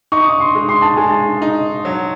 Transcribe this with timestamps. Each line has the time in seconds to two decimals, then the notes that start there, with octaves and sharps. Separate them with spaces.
0.12 D#4 C#6
0.21 D#6
0.30 C#6
0.40 C6
0.55 G#3
0.69 C6
0.82 A5
0.97 G#3 G#5
1.09 A5
1.42 D#4
1.85 F#3